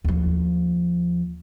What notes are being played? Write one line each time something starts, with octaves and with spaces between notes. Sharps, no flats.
D#2 F3